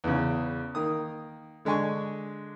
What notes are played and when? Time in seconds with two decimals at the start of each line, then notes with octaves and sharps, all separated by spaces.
0.04 E2 C#3
0.75 D#3 A#3 D#6
1.65 D3 G#3 D4 G#5 C#6